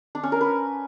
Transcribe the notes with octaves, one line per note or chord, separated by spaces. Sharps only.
D4
C#4
A#4
B4